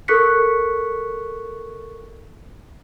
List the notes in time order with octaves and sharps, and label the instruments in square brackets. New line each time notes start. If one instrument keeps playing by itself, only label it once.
[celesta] A4 A#4 C#6 F#6 B6 C#7